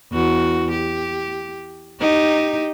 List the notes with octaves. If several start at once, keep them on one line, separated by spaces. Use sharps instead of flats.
E2 F#4
G4
D#4 G4